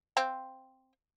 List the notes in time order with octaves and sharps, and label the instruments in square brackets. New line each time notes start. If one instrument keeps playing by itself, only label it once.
[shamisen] C4 C5 F5